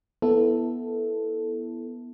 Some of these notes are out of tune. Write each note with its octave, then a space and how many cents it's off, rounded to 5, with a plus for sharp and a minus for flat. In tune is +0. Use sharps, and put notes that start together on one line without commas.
B3 -15 E4 +0 A4 +0